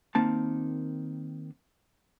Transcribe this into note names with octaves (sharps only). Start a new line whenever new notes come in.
D#3 A#3 C4 A5